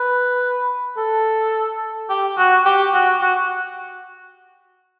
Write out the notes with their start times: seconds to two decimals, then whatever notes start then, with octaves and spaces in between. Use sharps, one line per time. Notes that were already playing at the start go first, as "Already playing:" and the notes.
Already playing: B4
0.97 A4
2.09 G4
2.37 F#4
2.65 G4
2.93 F#4
3.21 F#4